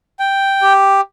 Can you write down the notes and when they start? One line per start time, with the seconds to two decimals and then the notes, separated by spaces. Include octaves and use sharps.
0.19 G5
0.62 G4